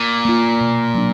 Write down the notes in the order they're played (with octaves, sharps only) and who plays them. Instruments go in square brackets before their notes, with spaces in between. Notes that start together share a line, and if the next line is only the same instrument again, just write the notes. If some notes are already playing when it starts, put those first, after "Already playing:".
Already playing: [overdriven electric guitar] A#2
[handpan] A#3 F4
B2
F#3 D4